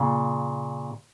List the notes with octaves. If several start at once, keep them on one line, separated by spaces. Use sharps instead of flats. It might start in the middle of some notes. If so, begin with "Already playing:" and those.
Already playing: A#2 C#3